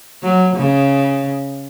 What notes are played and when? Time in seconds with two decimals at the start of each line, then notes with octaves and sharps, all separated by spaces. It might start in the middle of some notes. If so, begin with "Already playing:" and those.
0.22 F#3
0.56 C#3